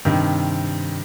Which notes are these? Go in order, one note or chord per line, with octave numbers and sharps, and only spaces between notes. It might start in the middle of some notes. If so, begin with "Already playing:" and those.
G2 C3 D#3